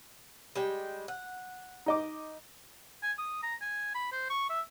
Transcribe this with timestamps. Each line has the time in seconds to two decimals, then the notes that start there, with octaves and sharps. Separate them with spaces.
0.55 G3 G#3 G5
1.08 F#5
1.86 D#4 D#5 D6
3.03 G#5
3.18 D#6
3.43 A#5
3.61 G#5
3.94 B5
4.12 C5
4.30 C#6
4.49 E5